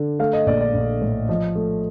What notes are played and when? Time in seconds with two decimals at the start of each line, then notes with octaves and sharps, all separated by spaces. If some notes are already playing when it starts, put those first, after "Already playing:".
Already playing: D3
0.19 A3 F5
0.33 D#5
0.46 A#1 D5
0.61 D5
0.74 A#1
1.02 A2
1.29 F3 D#5
1.56 A3